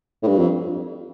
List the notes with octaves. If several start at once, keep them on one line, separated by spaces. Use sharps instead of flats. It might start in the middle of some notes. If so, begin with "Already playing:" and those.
A2
G2
F2